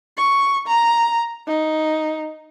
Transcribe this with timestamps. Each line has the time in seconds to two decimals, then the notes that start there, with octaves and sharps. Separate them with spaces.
0.17 C#6
0.68 A#5
1.47 D#4